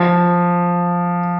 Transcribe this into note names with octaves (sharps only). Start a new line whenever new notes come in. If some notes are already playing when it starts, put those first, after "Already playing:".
Already playing: F3